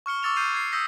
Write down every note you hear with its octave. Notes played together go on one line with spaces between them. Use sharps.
C#6 F6 C#7 G7
C#6 D6 E6 A6 C#7 F7
F6 G6 C7 D#7 F7
G#6 C7
D#6 E6 G6 A#6 B6